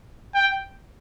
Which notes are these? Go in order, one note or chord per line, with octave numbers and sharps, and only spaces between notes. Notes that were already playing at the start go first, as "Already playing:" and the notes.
G5